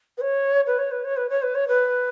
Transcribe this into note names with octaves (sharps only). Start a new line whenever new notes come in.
B4
C#5
B4
C#5
B4
C#5
B4
C#5
B4
C#5
B4